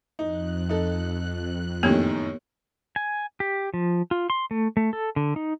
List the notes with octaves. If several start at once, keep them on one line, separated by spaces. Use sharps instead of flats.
F2 D#4 F#6
D#4 A4
F#2 A2 D#3 A#3 B3 G4
G#5
G4
F3
F4
C6
A3
A3
A4
D3
D#4